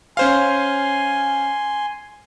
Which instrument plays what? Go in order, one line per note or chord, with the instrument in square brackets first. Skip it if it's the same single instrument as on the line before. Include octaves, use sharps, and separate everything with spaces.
[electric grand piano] C#4 C5 F5 [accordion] G#5 C6